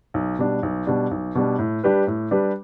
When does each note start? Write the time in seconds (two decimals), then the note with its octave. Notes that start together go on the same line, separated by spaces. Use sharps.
0.14 B1
0.38 B2 G3 D4
0.63 B1
0.87 B2 G3 D4
1.11 B1
1.35 B2 G3 D4
1.59 A2
1.84 G3 D4 G4 B4
2.07 A2
2.31 G3 D4 G4 B4